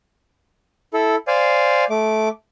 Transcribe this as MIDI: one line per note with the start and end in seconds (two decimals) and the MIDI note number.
0.94 1.16 64
0.94 1.16 69
1.27 1.85 72
1.27 1.85 74
1.27 1.85 77
1.27 1.85 80
1.90 2.29 57
1.90 2.29 86